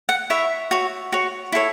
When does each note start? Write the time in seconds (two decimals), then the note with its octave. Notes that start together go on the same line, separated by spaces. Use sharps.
0.09 F#5
0.30 E4 C#5 E5
0.71 F#4 C#5
1.12 F#4 C#5
1.52 E4 A4 C#5